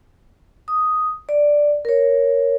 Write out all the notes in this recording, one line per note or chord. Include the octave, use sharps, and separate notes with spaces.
D#6
D5
A#4 C#5